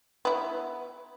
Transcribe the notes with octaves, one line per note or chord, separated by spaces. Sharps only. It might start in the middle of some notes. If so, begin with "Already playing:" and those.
B3 E4